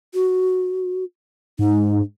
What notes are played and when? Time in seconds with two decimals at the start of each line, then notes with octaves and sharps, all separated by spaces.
0.14 F#4
1.59 G#2 D#4